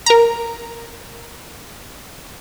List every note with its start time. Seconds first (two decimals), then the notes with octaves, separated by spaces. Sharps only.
0.06 A#4 A#5